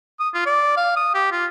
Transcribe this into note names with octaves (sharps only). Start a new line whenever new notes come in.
D#6
F4
D5
F5
D#6
G4
F4